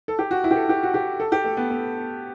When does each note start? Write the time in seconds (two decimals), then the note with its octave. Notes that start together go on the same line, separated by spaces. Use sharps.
0.08 A4
0.19 G4
0.31 F#4
0.44 E4
0.51 G4
0.56 A4
0.69 G4
0.83 F#4
0.94 G4
1.20 A4
1.32 G4
1.44 A3
1.57 B3
1.70 B3